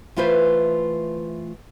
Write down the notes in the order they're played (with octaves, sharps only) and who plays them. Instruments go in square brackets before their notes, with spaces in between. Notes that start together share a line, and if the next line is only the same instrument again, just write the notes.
[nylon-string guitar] E3 A3 F4 B4 C5 E5